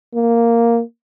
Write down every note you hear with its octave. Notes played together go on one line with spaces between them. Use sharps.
A#3